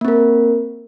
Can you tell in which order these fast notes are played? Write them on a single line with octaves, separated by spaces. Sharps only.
A#3 C4 A#4